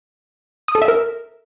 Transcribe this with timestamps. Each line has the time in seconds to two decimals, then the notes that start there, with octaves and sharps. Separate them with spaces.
0.68 D#6
0.75 A4
0.82 E5
0.88 A#4